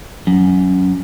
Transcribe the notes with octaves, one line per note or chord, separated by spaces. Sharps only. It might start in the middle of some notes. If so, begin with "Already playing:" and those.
F#2